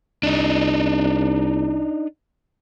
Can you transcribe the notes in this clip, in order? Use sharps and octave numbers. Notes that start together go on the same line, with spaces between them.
C2 D4 D#4